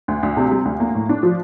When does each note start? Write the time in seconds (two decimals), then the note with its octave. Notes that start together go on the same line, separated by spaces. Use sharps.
0.08 D2
0.23 D2
0.37 C3
0.51 G3
0.65 D2
0.80 A#3
0.95 A2
1.09 D4
1.23 F3